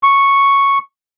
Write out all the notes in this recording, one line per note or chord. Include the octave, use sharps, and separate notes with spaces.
C#6